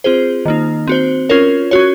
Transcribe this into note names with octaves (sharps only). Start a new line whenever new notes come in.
C4 F4 G#4 C5
D#3 A#3 D#4
C4 F#4 C5
C#4 F4 A#4 C#5
C#4 F#4 C#5